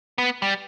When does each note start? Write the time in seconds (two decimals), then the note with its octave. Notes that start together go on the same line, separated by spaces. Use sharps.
0.18 B3
0.42 G3